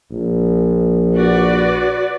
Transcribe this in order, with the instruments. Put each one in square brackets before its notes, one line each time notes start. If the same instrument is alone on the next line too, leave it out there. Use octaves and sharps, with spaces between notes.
[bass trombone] A#1
[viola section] F#4 B4 D5